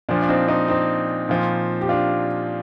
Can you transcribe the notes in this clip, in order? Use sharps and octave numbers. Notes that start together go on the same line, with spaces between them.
A#2 F3 D4
D4
C4 D#4
C4 D#4
C4 D#4
A#2 F3
G4
D4 F4